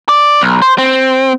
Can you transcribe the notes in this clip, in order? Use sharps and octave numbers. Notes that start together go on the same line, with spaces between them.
D5
B1
C5
C4